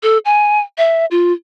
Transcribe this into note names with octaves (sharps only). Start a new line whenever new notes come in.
A4
G#5
E5
F4